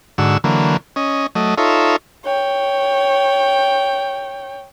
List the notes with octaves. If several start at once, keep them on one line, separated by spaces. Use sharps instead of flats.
G#2 D3 F#4 E6
D3 E3 F#3 A#3
C#4 D#5
F#3 A3 D#5
D#4 F4 A4 C#5 E5
C#5 G5